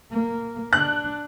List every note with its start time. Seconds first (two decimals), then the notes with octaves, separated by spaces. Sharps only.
0.11 A#3
0.73 D4 F#6